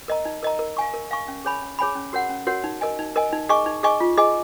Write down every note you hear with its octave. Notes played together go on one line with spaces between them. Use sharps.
A#4 D#5 A#5
D#4
A#4 D#5 A#5
A#4
F5 G#5 C#6
A#4
F5 G#5 C#6
C#4
G#4 C#5 G#5 B5
C#4
G#4 C#5 G#5 B5
C#4
F#4 A#4 C#5 F#5
C#4
F#4 A#4 C#5 F#5
D#4
A#4 D#5 G#5
D#4
A#4 D#5 G#5
D#4
G#4 D#5 G#5 C#6
D#4
G#4 D#5 G#5 C#6
F4
G#4 D#5 G#5